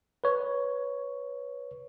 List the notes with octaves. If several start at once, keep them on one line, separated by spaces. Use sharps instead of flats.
B4 C#5